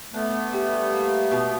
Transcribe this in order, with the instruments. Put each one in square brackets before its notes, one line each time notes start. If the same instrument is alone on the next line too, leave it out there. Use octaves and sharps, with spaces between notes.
[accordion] A3 B3 [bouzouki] D4
[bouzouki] G3
A#3
B2